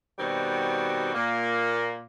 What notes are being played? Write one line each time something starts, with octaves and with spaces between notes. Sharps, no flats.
B2 D#3 G3 C4 F#4
A#2 A#3